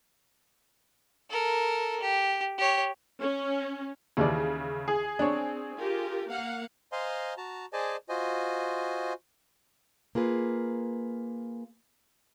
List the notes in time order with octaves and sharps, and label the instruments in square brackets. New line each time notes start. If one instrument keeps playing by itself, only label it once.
[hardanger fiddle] A4 A#4
G4
G4 C#5
[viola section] C#4
[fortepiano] D#2 E3 D5 [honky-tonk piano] C#3
[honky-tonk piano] G#4
[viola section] C4 [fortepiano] D4 C#5
[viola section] F4 G4 A#4
A#3 F5 F#5
[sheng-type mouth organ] C5 D#5 F5 G#5 A#5 C6
F#4 A5 A#5
G#4 C5 D5 D#5 G#5 A5
F4 F#4 C5 D#5 G#5
[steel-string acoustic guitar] A#3 F4 G#4 B4